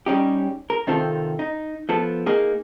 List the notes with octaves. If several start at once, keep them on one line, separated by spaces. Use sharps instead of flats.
G3 C#4 D#4 G4
A#4
C3 D#3 C4 F4 A4
D#4
F3 B3 A4
A#3 D#4 G#4